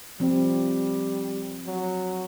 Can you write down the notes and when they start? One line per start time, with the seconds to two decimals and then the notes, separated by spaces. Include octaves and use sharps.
0.20 F3 G3 C4
1.67 F#3